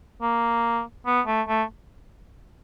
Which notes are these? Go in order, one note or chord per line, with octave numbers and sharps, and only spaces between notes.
A#3
B3
A3
A3